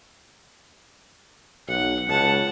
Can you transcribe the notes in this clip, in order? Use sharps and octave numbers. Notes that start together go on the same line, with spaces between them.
B1 F#5
C#2 F#5 A5